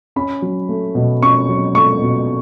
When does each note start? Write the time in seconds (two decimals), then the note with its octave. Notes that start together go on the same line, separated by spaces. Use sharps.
0.16 C#4 B5
0.42 F#3
0.69 A3
0.95 B2
1.22 C#4 C#6
1.49 F#3
1.75 A3 C#6
2.02 B2